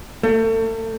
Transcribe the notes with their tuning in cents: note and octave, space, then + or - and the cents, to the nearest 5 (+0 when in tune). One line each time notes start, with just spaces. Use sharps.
A3 +35